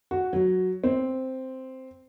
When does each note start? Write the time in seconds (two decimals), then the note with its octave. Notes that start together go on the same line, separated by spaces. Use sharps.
0.11 F#4
0.33 F#3
0.84 C4